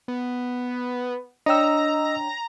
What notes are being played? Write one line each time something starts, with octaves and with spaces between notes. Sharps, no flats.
B3
D4 C#5 D#5 G5 A#5 E6